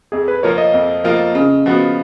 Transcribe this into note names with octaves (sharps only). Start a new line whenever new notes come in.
F2 G#4
B4
F3 A#3 F4 A#4 C#5
D#5
F2
F3 A#3 F4 A#4
C#3
F3 B3 F#4